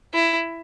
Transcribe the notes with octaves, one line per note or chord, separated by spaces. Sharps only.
E4